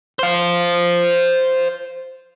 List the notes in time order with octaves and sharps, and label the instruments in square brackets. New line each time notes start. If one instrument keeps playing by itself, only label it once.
[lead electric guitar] C5 F5